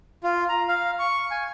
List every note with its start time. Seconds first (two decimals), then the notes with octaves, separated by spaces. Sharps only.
0.24 F4
0.49 A#5
0.68 F5
0.99 C#6
1.31 G#5